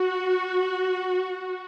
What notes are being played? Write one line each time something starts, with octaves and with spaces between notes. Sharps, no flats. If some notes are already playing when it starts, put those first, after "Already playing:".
Already playing: F#4